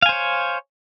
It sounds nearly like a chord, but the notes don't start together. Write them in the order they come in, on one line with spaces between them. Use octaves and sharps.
F5 G#5 C5 C#5